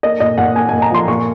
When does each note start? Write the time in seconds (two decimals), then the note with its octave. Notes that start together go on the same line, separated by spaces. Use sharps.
0.03 A#3 D#5
0.20 A#2 D#5
0.38 A#2 F#5
0.56 A#3 G#5
0.69 A#2 G#5
0.82 A#5
0.91 F3 C6
1.08 A#2 C#6